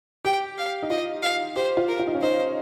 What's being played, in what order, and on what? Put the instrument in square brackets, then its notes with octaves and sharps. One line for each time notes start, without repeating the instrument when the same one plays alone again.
[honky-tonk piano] G4 [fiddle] G5
[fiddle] F5
[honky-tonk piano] D#4
[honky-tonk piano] F4 [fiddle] D#5
[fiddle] F5
[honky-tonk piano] G4 [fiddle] C5
[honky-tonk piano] F4
[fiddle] A#4
[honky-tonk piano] F4
D#4
C#4
[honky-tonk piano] D#4 [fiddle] C5